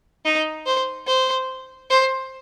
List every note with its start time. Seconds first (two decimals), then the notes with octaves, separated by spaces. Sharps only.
0.25 D#4
0.66 C5
1.07 C5
1.90 C5